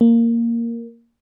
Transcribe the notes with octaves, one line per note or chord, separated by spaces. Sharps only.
A#3